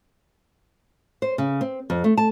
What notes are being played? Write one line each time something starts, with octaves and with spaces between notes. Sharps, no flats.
C5
C#3
C4
F2
A3
A5